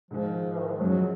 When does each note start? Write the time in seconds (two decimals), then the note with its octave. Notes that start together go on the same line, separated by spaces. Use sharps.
0.11 G#2 D#3 F3 G#3
0.59 D#3
0.69 F3
0.80 F#2 C#3 F3 F#3 G#3